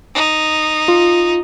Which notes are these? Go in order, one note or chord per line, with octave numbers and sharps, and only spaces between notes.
D#4
F4